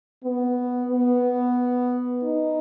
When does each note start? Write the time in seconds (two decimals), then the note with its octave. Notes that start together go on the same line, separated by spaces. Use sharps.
0.24 B3
0.90 B3
2.23 D#4